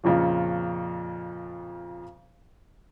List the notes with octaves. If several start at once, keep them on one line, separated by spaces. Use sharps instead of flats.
F2 A#2 C#3 F3